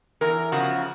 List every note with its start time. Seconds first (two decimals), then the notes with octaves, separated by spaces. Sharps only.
0.21 E2 A#4
0.52 C#3 F3 F#4